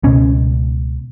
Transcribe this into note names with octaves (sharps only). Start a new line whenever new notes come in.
C#2 B2 C#4